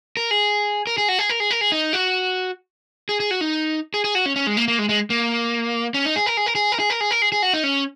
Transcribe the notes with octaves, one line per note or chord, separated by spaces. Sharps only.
A#4
G#4
A#4
G#4
F#4
G#4
A#4
G#4
A#4
G#4
D#4
F#4
G#4
G#4
F#4
D#4
G#4
G#4
F#4
C#4
C#4
G#3
A#3
A#3
G#3
G#3
A#3
C#4
D#4
G#4
A#4
G#4
A#4
G#4
A#4
G#4
A#4
G#4
A#4
G#4
G#4
F#4
D#4
C#4